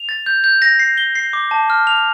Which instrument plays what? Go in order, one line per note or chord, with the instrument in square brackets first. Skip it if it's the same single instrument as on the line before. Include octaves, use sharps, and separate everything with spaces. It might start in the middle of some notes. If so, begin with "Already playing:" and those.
Already playing: [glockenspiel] F7
A6
G6
G6
A#6
C7
G7
C7
D6
A5
F6
F7